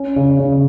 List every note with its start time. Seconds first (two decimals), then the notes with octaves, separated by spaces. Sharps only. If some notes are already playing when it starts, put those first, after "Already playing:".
Already playing: C#4
0.16 C#3
0.39 C#3